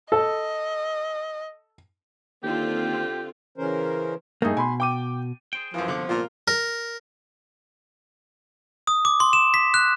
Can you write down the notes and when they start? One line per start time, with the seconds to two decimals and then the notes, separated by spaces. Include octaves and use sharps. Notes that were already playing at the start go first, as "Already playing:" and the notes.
0.12 A4 D#5
2.44 D#2 D3 C4 F4 G4
3.58 C#3 E3 C#4 A#4 C5
4.42 G2 A3 A#3 D#4 G#4
4.57 B2 G#5 B5 C6
4.80 G5 D6 D#7
5.53 G#4 C5 G5
5.74 F#2 E3 F3
5.88 C2 D3 B3 C#5 D6
6.09 A#2 F4 A#4
6.48 A#4
8.87 D#6
9.05 D6
9.20 C6
9.33 E7
9.54 B6
9.74 F#6